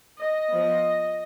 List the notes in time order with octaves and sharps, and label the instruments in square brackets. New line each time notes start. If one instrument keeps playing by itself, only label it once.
[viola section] D#5
F3 B3